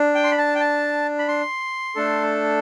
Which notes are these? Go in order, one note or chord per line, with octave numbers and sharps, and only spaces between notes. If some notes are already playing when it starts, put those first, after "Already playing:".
Already playing: D4
G5
C6
B5
A5
G5
A5
B5
C6
A3 D4 A4